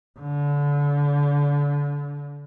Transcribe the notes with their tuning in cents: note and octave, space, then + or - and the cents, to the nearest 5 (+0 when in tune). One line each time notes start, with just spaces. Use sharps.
D3 -30